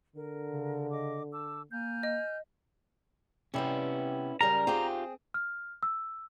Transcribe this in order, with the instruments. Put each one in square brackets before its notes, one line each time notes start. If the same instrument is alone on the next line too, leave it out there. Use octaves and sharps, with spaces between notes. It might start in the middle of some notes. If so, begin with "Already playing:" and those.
[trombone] D3 [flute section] A#4
[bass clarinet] C#3
[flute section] D#5 D6
A5 D6 E6
[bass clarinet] A#3 [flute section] G#5 F6 G6
[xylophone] D#5
[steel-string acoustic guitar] C3 G3 B3 [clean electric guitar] C#4 E4
[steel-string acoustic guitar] F#2 C#3 G3 [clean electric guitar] A#4 [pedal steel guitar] A#5
[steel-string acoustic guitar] C4 G#4 [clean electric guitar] F4 G4
[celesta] F6
E6